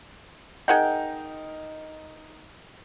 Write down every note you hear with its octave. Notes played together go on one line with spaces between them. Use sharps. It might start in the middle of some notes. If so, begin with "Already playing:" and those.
D#4 G#4 A#4 F#5 G5